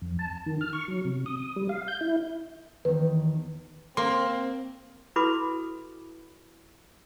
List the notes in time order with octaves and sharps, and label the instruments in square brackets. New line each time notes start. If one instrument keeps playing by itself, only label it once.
[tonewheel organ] F2
A5
D#3
F6
C#6
F#3
C3
D#6
G3
F5
G6
E4
[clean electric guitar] E2 D#3 [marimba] B4
[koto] A#3 [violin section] C4 [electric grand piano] C6
[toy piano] E4 F#4 A4 B4 B5 D6